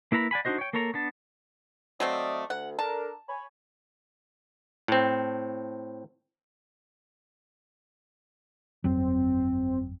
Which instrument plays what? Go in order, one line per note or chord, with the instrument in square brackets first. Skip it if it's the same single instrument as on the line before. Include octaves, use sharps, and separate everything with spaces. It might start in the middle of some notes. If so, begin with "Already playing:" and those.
[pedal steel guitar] A#3 E4 B4 A#5 B5
D5 F#5 G#5 B5
D4 D#4 F#4 C5 D#5
C#5 G5
A#3 A4 A#4 C#5 A#5
B3 D4 A5
[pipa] F#3 A3 C4 [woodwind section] D5 D#5 F5
[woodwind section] D2 [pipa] F#5
[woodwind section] D4 A4 A#4 [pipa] A5
[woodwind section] C#5 G#5 B5
[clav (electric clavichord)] A2 C4
[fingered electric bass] G1 F2 F#3 [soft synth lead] C4